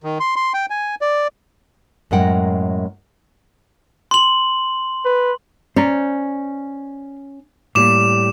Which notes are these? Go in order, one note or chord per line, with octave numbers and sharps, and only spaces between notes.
D#3
C6
C6
G5
G#5
D5
F#2 A2 G#3 A#4 F#5 G5
C6 F#7
B4
C#4 C5 D5 A#5
A2 G3 A#3 D6 E7